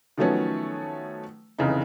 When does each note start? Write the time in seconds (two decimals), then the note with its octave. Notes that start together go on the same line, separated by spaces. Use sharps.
0.18 D#3 F3 F#3 A3 B3 C#4
1.59 F1 C#3 E3 D#4